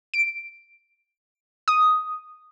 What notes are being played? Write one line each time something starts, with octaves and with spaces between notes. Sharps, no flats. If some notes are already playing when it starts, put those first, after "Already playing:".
D7
D#6